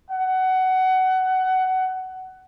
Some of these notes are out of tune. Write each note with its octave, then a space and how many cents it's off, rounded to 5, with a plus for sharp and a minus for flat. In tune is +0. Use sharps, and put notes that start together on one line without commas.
F#5 +15